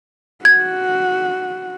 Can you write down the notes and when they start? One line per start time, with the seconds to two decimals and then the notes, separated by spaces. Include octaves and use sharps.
0.45 F#4 G#6